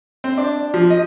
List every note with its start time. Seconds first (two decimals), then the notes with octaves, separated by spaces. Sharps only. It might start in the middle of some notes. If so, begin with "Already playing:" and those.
0.24 C4
0.38 D4
0.74 F3
0.90 D#5